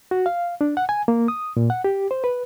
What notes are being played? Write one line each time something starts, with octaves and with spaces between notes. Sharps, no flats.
F#4
F5
D4
F#5
G#5
A#3
D#6
A#2
F#5
G4
C5
B4